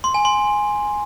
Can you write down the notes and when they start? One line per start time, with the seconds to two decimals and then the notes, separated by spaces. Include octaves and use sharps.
0.04 C6
0.14 G#5
0.25 C6